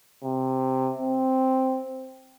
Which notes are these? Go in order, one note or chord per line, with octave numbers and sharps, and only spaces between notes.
C3
C4